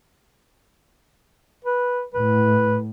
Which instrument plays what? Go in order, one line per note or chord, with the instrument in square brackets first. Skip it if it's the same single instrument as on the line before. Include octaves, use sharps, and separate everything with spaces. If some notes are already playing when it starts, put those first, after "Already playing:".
[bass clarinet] B4
[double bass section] A2 [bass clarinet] B4